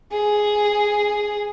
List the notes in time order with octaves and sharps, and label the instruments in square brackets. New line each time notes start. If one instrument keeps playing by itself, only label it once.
[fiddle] G#4